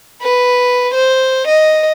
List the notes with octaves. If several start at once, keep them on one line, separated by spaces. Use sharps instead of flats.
B4
C5
D#5